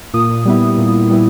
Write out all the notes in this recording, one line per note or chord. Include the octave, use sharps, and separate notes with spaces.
A#2 D#6
G3 B3 E4
A#2
G3 B3 E4